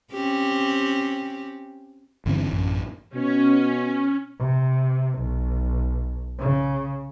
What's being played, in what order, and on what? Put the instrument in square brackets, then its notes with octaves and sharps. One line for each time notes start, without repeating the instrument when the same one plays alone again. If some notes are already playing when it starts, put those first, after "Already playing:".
[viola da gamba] C4 C#4 G4
[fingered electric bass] G1 D3 E3 C4
D#1 A1 F#2
[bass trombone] B2 [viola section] C#4
[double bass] C3
B1
C#3